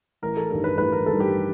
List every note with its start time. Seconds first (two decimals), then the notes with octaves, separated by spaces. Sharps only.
0.22 A1 A#4
0.37 A4
0.50 G2 D#3 G3 A#4
0.64 B4
0.78 A1 B4
0.92 A#4
1.06 G2 D#3 G3 A4
1.20 G4